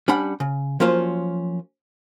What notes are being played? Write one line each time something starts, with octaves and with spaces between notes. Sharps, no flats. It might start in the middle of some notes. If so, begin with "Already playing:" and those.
G3 C#4 D4 F#5 B5
C#3
F3 F#3 A#3 C#4 F4 C5